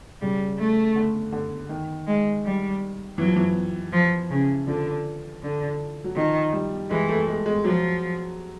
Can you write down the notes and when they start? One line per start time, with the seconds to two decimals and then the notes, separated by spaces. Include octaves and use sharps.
0.21 C#3 G3
0.58 A3
0.96 D3
1.32 D3
1.69 D#3
2.07 G#3
2.45 G3
3.18 E3 F#3
3.28 F3
3.36 E3
3.93 F3
4.30 C#3
4.67 D3 F3
5.42 D3
6.04 F#3
6.16 D#3 F3
6.53 G3
6.90 E3 G#3
7.09 A3
7.28 G#3
7.46 G#3
7.64 F3 F#3